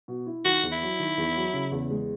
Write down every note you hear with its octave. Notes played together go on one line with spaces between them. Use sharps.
B2
E4
D#3 F#4
E2
E4
F#3
D#3
E2
F#3
C#3
E2
G#3